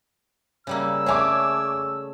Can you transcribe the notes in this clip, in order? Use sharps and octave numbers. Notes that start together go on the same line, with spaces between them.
C#3 G3 A#3 E6
A3 C#4 G#4 C#5 G#5 D6